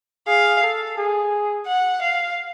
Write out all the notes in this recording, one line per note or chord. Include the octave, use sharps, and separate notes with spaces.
G#4 F5
A4
G#4
F#5
F5